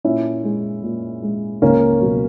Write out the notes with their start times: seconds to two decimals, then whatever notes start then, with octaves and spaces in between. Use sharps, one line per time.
0.04 A#2 C#4 E4
0.44 G#3
0.83 A#2
1.22 G#3
1.62 C#2 A#3 C#4
2.01 B2 F#3